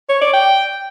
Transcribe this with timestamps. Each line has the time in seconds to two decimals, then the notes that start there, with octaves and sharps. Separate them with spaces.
0.10 C#5
0.21 D5
0.33 G5